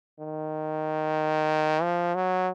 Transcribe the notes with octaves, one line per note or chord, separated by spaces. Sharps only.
D#3
F3
F#3